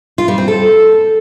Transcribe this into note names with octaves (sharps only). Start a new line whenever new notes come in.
F4
G3
C4
A4